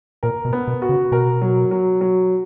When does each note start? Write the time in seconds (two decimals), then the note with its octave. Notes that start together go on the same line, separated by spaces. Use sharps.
0.23 A#2 A#4
0.45 B2
0.53 B3
0.68 B2
0.82 F#4
0.89 C#3
1.12 B2 A#4
1.42 F#3
1.71 F#3
2.01 F#3